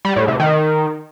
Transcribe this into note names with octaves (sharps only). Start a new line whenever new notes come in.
G3
A2
C3
D#3